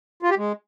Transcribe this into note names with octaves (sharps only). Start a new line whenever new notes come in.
F4
G4
G#3